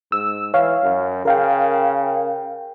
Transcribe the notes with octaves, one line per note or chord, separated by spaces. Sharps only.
G#2 E6
E3 C#5 F5
F#2
C#3 A#4 F5 G5